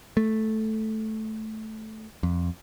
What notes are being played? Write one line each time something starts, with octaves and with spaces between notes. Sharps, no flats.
A3
F2